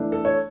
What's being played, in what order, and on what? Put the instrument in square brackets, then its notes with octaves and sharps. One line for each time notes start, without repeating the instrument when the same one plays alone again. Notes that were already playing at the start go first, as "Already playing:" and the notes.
Already playing: [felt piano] E3 A3 D4
[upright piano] A4
C#5